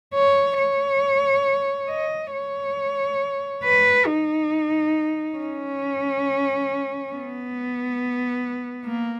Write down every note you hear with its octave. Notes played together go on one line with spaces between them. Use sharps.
C#5
C#5
D#5
C#5
B4
D#4
C#4
B3
A#3